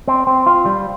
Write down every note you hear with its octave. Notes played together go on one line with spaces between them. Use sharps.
C4
C4
F4
G3